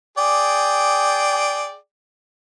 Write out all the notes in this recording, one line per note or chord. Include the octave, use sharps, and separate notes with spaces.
G#4 D5 G5